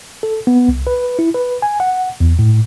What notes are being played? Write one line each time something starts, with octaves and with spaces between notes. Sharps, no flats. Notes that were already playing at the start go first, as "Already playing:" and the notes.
A4
B3
C2
B4
E4
B4
G#5
F#5
E2
A2